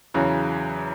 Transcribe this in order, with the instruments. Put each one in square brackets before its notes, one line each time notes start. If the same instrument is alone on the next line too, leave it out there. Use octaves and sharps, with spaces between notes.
[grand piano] E2 C#3 F#3